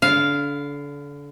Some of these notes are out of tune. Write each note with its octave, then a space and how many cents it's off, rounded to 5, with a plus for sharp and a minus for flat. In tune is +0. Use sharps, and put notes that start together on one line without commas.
D3 -30 F5 +0